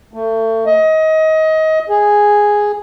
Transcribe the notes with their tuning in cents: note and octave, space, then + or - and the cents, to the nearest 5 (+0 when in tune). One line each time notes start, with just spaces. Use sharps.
A3 +30
D#5 +25
G#4 -5